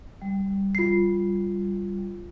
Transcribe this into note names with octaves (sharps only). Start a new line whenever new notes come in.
G3
F4 C7